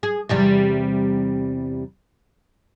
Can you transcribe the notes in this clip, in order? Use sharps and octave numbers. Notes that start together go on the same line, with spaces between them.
G#4
E2 C3 G3